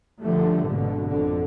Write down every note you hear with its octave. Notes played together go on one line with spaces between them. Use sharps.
D3 F3 G3 A3
G#1 G#2 B2 D3
G#1 F2 D3